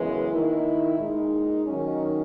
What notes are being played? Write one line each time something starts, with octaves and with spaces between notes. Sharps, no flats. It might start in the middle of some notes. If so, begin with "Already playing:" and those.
Already playing: F#2 C#3 E3 G#3 B3
D#3 A#3 E4
A#2 G#3 D#4
D#3 F#3 C#4